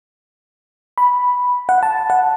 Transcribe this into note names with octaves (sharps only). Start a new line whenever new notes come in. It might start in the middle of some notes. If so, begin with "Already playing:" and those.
B5
F#5
A5
F#5